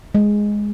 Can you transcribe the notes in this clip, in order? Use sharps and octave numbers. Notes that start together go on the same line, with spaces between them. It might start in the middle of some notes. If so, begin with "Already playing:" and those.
G#3